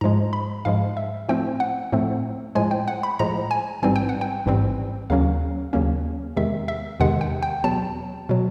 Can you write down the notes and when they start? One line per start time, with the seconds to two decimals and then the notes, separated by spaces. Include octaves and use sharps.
0.01 G#2 F3 G#3 A#5
0.33 B5
0.65 G#2 F3 G#3 F5
0.97 E5
1.29 A2 F3 A3 C4 G5
1.60 F#5
1.92 A2 F3 A3 C4
2.55 A2 F3 G#3 G#5
2.71 G5
2.88 F#5
3.03 B5
3.19 A2 F3 G#3 A#5
3.51 G#5
3.82 A1 G#2 E3 G3 C4 G#5
3.96 G5
4.09 F#5
4.21 G5
4.46 A1 G#2 E3 G3 C4
5.10 D#2 C#3 F#3 A#3 C#4 F5
5.73 D#2 C#3 F#3 A#3 C#4
6.37 E2 C3 D#3 G#3 E5
6.68 E5
7.00 E2 C3 D#3 G#3 F#5
7.21 G5
7.42 G5
7.64 E2 B2 F#3 A5
8.29 B2 F#3